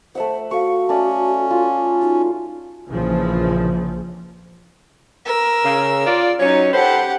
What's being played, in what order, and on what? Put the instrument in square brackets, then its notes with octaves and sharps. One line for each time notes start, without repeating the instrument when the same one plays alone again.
[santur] A3 E5 F#5 [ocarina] C5
[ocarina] F#4 [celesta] A4 F5 [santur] C#6
[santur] A3 D5 [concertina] C#4
[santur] F4
[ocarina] D#4 [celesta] F#4
[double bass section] A#1 C#3 E3 F3
[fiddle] A#4 E6
[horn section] C#3
F4 D5
[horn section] F#3 C#5 [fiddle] C#4 D#4
[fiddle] G4 F#5 [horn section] A4 B4 C5